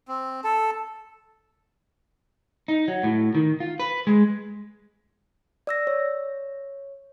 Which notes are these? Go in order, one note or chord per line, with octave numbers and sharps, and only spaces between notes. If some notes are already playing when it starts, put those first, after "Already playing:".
C4
A4
D#4
F#3
A2
D#3
F4
B4
G#3
D5 E6 A#6
C#5